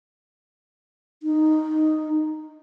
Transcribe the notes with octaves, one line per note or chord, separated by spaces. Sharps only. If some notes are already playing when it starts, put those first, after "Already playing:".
D#4